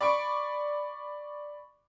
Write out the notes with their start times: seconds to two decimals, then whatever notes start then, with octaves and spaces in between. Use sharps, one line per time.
0.01 D5 B5 C#6 D7